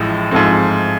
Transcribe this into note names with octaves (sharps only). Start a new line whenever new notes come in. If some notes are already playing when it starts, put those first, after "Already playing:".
Already playing: A1 A2 F3 G#3
G#2 F3 A3 C4